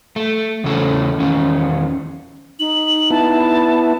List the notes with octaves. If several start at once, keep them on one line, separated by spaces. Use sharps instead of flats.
A3
E2 C#3 A3 C#4 A4
E2 D#3 C#4
D#4 F#7
B3 E4 A5